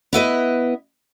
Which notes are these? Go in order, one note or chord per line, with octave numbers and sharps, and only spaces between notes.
B3 E4 B4 D#5